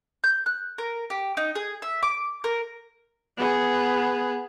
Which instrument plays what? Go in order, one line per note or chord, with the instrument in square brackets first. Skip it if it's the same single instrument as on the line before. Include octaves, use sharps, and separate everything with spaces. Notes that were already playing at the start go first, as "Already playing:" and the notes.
[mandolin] G6
F#6
A#4
G4
D#4
G#4
E5
D6
A#4
[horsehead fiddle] B3 G#4